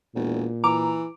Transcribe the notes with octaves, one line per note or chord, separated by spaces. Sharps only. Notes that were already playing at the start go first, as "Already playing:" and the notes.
E1 A#2
E3 A#5 D6